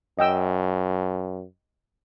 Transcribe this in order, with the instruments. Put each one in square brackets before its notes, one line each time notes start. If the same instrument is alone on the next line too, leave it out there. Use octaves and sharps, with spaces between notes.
[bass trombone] F#2 [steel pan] D#5 G5 E6